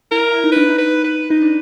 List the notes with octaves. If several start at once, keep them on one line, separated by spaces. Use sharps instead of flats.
E4 A#4
E4
D#4
D4 B4
D#4
B4
B4
D#4 B4
D4